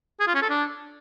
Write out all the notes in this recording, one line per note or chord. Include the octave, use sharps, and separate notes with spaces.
G#4
F4
C#4
A4
D4